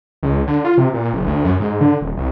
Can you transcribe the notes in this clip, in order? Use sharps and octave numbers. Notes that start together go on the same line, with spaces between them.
C#2
D3
F4
C3
A#2
F#1
D2
F#2
G#2
D3
D#1
C2